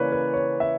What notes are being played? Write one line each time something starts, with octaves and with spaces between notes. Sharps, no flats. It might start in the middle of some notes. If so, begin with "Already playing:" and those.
Already playing: C#3 E3 A#3 B4 C#5 D5
B4
C#5
E5